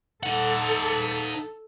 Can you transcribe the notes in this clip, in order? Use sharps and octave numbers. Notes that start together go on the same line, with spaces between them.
D#4 A4 F#5